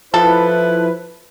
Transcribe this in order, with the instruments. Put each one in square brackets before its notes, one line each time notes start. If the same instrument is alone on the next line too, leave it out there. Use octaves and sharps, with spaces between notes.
[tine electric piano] F3 [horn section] E4 B4 [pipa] A4